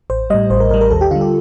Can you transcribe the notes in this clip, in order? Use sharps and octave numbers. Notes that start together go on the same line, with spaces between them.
A1 C5
A2 G3 D#5
A1 C5
A#4
A2 G3 A#4
A#4
D#2 A4
G4
D3 G3 F4
G4